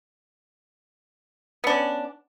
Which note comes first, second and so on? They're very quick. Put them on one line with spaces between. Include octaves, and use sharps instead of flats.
B3 D4 C#4